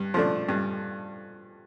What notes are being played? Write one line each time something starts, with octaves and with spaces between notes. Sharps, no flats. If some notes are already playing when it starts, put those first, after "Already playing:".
Already playing: G2
F3 A3 D4
G2